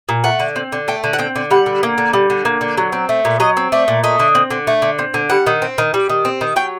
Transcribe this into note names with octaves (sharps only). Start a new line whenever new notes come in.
A#2
A3 F#5
D3
C4
D3
A3 G5
D3
F#5
C4 G5
D3
G3 F#5
D3
A#3
D3
G3
D3
A#3
D3
F#3
C4
A3
A#2
F#3 D#5
C4
A3 D5
A#2
A3 D#5
D3
C4
D3
A3
D3
C4
D3
G3 F#5
D#3
C4
D#3
G3
D#3
C4
D#3
F#3 G5